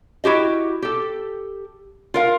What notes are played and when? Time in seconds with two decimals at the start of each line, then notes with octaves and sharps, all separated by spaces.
0.24 E4 F#4 G4 D#5
0.82 G4 A4
2.14 F4 A#4 F5